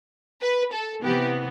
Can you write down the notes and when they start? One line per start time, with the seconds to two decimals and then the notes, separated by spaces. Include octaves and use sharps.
0.41 B4
0.73 A4
1.03 C3 E3 B3 G4